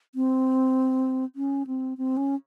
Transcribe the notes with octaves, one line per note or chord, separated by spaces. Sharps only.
C4
C#4
C4
C4
C#4